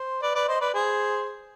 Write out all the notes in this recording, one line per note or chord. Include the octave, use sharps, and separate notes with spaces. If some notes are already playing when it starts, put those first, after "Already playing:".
Already playing: C5
B4 D5
B4 D5
C5 D#5
B4 D5
G#4 C5